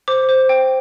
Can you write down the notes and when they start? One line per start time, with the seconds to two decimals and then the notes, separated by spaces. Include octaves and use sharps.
0.08 C5 D6
0.29 C5
0.49 G5